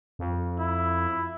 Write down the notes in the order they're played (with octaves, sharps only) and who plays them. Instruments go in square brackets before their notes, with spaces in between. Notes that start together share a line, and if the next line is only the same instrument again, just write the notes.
[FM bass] F2
[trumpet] E4